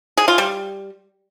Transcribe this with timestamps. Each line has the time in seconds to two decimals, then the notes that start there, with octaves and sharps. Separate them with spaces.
0.17 G#4
0.28 F4
0.38 G3